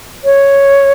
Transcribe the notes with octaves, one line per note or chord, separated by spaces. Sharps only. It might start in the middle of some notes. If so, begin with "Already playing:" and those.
C#5